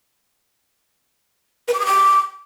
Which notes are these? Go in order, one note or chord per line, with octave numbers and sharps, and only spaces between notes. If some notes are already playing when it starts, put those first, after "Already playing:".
B4
D6
D#6
D6